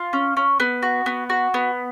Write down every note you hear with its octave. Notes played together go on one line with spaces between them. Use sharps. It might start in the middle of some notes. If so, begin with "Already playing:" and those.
Already playing: F4
C#4
C#4
B3
F#4
B3
F#4
B3